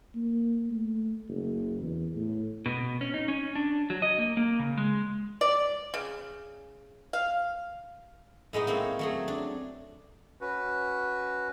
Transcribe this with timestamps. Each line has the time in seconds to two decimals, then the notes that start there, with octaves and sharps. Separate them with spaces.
0.15 A#3
0.70 A3
1.28 F#1
1.80 E2
2.15 A2
2.66 B2
3.01 C#4
3.14 D#4
3.28 C#4
3.55 D4
3.90 F#3
4.02 D#5
4.18 A#3
4.37 A#3
4.59 C#3
4.77 G#3
5.41 D5
5.94 C#3
7.13 F5
8.53 A2 G#3 B3 D#4
8.67 A#3 C4 E4 C#5
8.99 F#3 A3 G#4
9.28 D4
10.41 C#4 F#4 B4